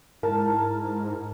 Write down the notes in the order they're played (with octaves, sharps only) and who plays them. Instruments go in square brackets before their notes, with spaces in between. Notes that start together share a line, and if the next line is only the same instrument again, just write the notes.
[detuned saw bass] G#2 [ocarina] E4 [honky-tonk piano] A#4 [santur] A5